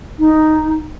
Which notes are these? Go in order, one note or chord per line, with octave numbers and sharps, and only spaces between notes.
D#4